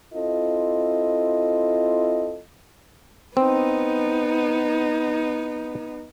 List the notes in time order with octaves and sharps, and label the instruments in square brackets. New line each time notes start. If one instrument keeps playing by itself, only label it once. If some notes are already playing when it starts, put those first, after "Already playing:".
[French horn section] C4 E4 F4 A4 D#5
[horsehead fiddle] B3 D#4 [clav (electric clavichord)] C4